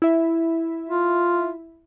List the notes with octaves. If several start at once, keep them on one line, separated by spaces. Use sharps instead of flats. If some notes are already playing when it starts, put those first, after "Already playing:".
E4 E5
F4